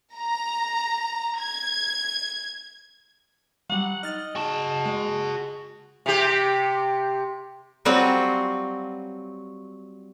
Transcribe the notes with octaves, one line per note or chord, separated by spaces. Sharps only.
A#5
G#6
F#3 G3 F#5
D#4 D#5 F6 A6
F#4 G#4 A5
G#3
C3 G4
F#3 G3 C4 F4 F#4